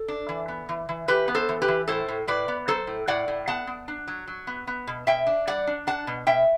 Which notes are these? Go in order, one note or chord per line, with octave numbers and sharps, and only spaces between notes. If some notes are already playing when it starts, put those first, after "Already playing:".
Already playing: A4
D4
E3
B3
E3
E3
E3 G4 B4
B3
A4 C5
E3
G4 B4
E3
A2 A4 C5
A2
A2 B4 D5
B3
F#3 A4 C5
A2
A2 D5 F#5
A2
B3 F#5 A5
B3
D4
F#3
F#3
B3
B3
B2
B2 E5 G5
D4
G3 D5 F#5
D4
D4 F#5 A5
B2
B2 E5 G5